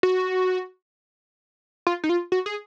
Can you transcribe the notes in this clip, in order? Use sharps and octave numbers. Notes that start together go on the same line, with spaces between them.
F#4
F4
D#4
F4
F#4
G#4